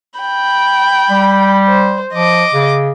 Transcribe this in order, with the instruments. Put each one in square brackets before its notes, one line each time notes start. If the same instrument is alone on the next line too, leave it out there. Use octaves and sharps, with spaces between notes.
[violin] G5 B5
[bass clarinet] G3
[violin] C5
[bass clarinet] F3 [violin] D#5 D6
[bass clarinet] C#3